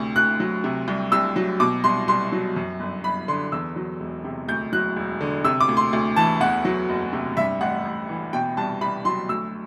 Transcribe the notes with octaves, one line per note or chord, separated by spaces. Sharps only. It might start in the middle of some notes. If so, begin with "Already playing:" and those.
Already playing: D2 C3
D2 F#6
F#3
C3
C2
C2 E6
F#3
B2 D6
C2 C6
C2 C6
F#3
F#2
G1
G1 B5
D3 C6
E2 E6
F#3
E1
C3
D2 G6
F#3 F#6
E1
D3
C3 E6
D6
D2
C6
D2
E3 A5
E2 F#5
F#3
F#1
C3
G2 E5
A1 F#5
A1
E3
B2 G5
C2 A5
C2 B5
F#3 C6
D2 E6